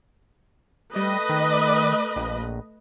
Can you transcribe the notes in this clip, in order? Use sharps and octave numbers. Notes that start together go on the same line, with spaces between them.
G3 A3 B4 D#5
D#3
A#1